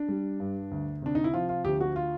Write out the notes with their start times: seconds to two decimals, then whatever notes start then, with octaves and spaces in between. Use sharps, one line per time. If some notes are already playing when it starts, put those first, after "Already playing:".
Already playing: D4
0.09 G3
0.40 G2
0.71 D2
1.02 C3 D4
1.15 D#4
1.24 E4
1.34 F3 F4
1.49 F4
1.64 D2 G4
1.81 F#4
1.96 F4